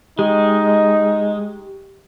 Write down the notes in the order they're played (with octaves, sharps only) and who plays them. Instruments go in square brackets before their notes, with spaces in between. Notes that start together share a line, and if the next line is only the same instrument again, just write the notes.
[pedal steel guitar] G#3 [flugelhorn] D#4 [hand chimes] G4